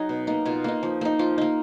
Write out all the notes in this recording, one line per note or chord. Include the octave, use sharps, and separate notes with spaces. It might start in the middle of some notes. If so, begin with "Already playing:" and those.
Already playing: F#3 D#4 F#4 G#4
B2
A#3 D#4
B2 F4
A#3 D#4
F3
A#3 D#4
F3 F4
A#3 D#4